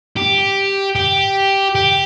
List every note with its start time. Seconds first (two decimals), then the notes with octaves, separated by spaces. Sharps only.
0.17 G4
0.95 G4
1.75 G4